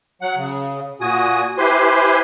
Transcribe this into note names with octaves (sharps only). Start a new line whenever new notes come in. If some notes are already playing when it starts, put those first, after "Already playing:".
F#3 F#5
C#3
A#2 F#4 G#5 D#6
E4 G4 B4 C5 G#5 C6